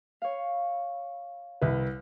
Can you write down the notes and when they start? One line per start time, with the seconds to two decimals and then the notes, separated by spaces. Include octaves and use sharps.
0.22 C#5 F5
1.62 C2 B4